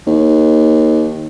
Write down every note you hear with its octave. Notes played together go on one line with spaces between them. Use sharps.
D#2